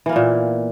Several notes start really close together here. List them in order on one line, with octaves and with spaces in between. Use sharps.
E3 A#3 B3 A#2